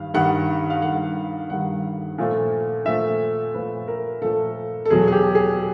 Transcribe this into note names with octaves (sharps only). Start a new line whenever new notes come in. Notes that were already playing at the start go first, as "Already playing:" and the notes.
Already playing: G2 D#3 G3 F5
G2 D#3 G3 F#5
F5
G2 D#3 G3 F#5
G2 D#3 G3 F#5
A#2 F3 A3
A#2 F3 A3 E5
A#2 F3 A3 B4
A#4
A#2 F3 A3 A4
A4
E2 B2 F#3 G#4
G#4
G4
G#4